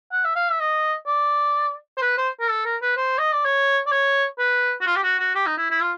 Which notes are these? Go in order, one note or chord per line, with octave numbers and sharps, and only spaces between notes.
F#5
E5
F5
E5
D#5
D5
C5
B4
C5
A#4
A4
A#4
B4
C5
D#5
D5
C#5
D5
C#5
B4
F#4
F4
G4
F#4
F#4
G4
D#4
E4
E4
F4